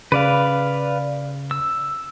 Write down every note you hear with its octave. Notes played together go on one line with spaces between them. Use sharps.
C#3 B4 D5 F5
E6